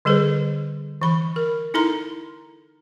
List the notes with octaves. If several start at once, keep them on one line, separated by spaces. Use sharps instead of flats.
D3 G3 G#4 A4 B4 C5
E3 B5
A#4
D#4 E4 A4 A#5 C6